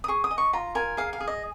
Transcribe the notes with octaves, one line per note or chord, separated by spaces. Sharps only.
D#6
G#4 C#6
D#6
D#5
C#6
F4 A#5
A#4 G#5
G#4 F5
F5
G#4
D#5